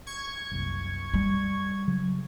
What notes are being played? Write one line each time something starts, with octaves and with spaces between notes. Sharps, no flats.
C#6 G#6
F#1 C2
G3
C#3 F#3